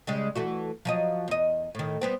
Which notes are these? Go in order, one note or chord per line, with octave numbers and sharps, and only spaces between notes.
C#3 G3 G#3
E3 A3 F#4
F3 F#3 D#5
E2 D#5
A2 D#3
G3 B3 C4